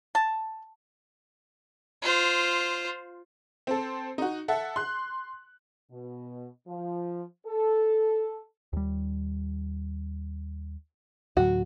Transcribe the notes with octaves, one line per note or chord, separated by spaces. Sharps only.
A5
F4 C5
C4 A4
D#4 F#4
A4 E5 F#5
C6 F#6
B2
F3
A4
D#2 G3
D2 A2 F#3 F#4